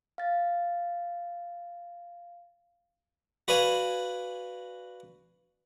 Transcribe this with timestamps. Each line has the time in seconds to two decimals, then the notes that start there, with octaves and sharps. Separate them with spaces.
0.18 F5 A6
3.48 F#4 B4 D5 F5 G#5